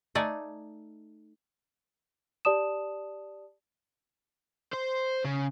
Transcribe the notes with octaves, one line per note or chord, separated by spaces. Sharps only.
A3 D#4 D5 G#5
G4 D5 A5 D#6 E7
C5
C#3